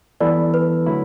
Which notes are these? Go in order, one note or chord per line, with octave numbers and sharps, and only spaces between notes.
E3 G3 B3 E4 A4 D5
B4
D3 F#3 A3 E4